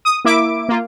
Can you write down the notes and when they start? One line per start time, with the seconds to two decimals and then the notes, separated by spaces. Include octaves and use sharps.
0.05 D#6
0.25 A#3 E4 E5 D6 D7
0.69 A#3 F4